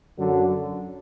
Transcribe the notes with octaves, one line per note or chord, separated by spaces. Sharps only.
F#2 D3 F#3